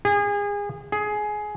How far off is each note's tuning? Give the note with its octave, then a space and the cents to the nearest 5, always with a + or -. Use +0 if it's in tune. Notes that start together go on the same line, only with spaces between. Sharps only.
G#4 -30
G#4 +15